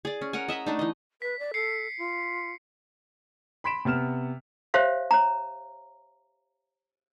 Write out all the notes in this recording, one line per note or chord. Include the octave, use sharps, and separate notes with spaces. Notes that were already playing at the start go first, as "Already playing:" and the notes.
G#4 D5
C#4
A#4 C#5 F#5 G#5
D#5 E5 A#5 B5
A3 D4 D#4
E3 D#5
B4 B6
D5
A4 C7 C#7
F4
B5 C6 B6 D7 E7
C3 B3 F6 E7
G4 C5 C#5 E5 F5
C#5 A#5